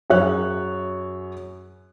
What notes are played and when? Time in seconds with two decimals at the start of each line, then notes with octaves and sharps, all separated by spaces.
0.10 F#2 G#4 C#5 F#6